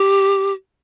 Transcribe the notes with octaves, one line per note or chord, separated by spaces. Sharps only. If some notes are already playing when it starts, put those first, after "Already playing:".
Already playing: G4